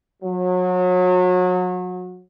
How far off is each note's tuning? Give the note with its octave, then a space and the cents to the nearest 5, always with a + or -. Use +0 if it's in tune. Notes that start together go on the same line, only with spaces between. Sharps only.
F#3 -30